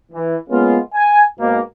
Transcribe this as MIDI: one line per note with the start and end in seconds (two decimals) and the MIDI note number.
0.12 0.36 52
0.49 0.78 56
0.49 0.78 58
0.49 0.78 59
0.49 0.78 61
0.49 0.78 65
0.94 1.22 80
1.39 1.59 44
1.39 1.59 47
1.39 1.59 58